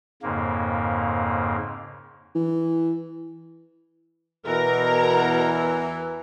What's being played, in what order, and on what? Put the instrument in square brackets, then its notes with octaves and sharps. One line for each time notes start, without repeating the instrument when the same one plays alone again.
[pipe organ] F2 G#2 C#3 A#3
[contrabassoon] E3
[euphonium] E2 [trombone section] B2 [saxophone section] E3 [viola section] A#4 A#5